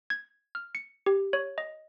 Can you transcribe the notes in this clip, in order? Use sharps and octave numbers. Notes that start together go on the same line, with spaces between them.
G#6
F6
C#7
G4
C#5
D#5